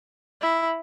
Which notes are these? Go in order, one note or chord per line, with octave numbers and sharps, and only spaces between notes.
E4